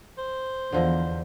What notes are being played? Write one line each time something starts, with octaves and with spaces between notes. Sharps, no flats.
C5
E2 D3 F3 D#5